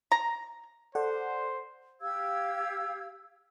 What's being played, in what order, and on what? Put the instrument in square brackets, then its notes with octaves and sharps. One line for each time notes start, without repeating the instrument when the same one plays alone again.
[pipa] A#5
[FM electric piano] A4 D5 F#5 [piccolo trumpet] C5
[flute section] G4 F5 E6 G#6